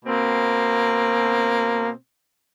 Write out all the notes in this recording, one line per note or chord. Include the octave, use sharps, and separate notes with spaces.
B2 A#3 C4